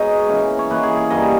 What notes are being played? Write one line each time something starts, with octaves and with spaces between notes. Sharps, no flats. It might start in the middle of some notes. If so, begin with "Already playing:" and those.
Already playing: B2 G#3 D#4 C#5 D#5
E3 A#3 C#4
C#5
E3 A#3 D#4 B4
G#4
G#4
G2 G3 A#3 D#5